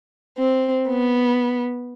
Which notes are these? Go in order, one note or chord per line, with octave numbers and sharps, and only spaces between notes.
C4
B3